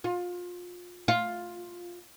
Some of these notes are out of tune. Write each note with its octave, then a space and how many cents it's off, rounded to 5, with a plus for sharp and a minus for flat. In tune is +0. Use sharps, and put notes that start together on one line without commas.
F4 +25
F4 +10